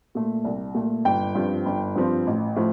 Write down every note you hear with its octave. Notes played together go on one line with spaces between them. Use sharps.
A#2 A3
C2
A#2 A3
G1 G5
G2 F3 C4
G1
G2 F3 C4
A1
A2 F3